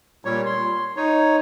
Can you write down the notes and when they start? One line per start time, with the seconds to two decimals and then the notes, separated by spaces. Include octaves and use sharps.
0.25 A#2 G3 C#5
0.46 C6
0.97 D#4 C#5